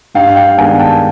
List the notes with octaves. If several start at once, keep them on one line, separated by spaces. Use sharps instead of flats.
G2 F5 G5
F5 G5
D#3 G#3 B3 D4 F#5 G#5
G5 A5